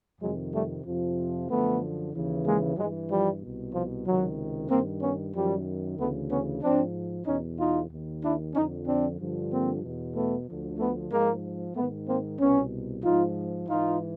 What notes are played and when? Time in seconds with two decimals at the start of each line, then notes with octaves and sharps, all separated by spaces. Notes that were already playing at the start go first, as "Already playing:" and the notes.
0.20 F2 C3 D#3 F#3 G#3
0.53 G3 A3
0.84 F2 C3 F3
1.49 F#2 D3 F3 A3 B3
2.14 D#2 C#3 E3
2.45 G#3 A#3
2.77 G2 E3 F#3 G#3
3.09 F3 G3
3.41 C2 B2
3.74 F3
4.06 C#2 C3 D#3 F#3
4.69 G2 D#3 A#3 C4
5.02 B3 C#4
5.34 F#2 D#3 F3 G3
5.98 D2 C#3 E3 A3 B3
6.30 B3 C#4
6.62 G#2 F3 C4 D4
7.26 E2 B2 C#4 D#4
7.59 D#4 F4
7.90 D#2 D#3
8.23 D4 E4
8.54 F2 D3 F3 C#4 D#4
8.86 C4 D4
9.19 G2 D3 F3
9.51 A#3 C4
9.83 E2 B2
10.15 A3 B3
10.48 D2 D3 F3
10.79 A3 B3
11.11 G#2 F3 G#3 A#3
11.75 G#2 D#3 A3 B3
12.07 A#3 C4
12.39 C2 B2 B3 C#4
13.04 G#2 F3 D#4 F4
13.68 G#2 E3 D#4 F4